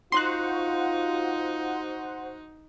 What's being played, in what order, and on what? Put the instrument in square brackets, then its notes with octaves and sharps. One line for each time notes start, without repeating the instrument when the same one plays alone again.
[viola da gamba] D#4 [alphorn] F4 [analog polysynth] F#4 C5 F#5 [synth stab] C6 F#6